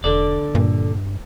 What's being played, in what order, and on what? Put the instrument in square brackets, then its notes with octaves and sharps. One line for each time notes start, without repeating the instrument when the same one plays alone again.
[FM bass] E1 [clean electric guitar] D3 A4 D5
[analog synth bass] G2 [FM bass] A#2